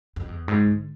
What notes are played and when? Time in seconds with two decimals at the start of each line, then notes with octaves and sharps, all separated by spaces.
0.16 F2
0.28 E2
0.48 G#2
0.67 D3